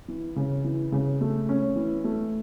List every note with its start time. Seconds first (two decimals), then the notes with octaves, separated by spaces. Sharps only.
0.08 E3
0.36 C#3
0.64 E3
0.92 C#3
1.21 A3
1.49 C#4
1.76 E3
2.04 A3